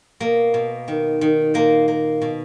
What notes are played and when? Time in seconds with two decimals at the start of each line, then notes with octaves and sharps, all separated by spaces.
0.20 B2 A#3
0.54 B2
0.88 D#3
1.21 D#3
1.54 A#2 A#3
1.88 A#3
2.22 B2